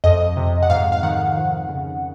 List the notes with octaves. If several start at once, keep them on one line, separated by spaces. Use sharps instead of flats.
F2 D#5
C3
F#5
G#2 F5
F5
D#3 F#5
F2
C#3